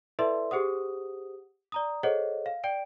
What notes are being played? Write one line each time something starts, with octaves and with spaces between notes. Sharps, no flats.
E4 A4 B4 D5 E5 C6
G4 G#4 C5 F#5 D#6
D5 A#5 D#6
G#4 A4 C5 C#5 D#5 F#5
F5
D5 G5 D7